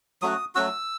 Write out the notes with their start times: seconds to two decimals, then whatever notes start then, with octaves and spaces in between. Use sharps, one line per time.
0.22 F#3 A3 C#4 F#4 D#6
0.55 F#3 A3 C#4 F#4 E6